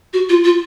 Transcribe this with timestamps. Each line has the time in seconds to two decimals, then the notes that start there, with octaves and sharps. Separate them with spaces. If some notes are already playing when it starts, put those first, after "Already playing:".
0.13 F#4
0.29 F4
0.44 F4